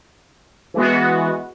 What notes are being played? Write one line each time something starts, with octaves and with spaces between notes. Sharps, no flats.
E3 G#3 B3 F#4